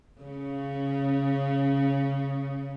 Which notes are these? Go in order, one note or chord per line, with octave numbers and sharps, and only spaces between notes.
C#3 C#4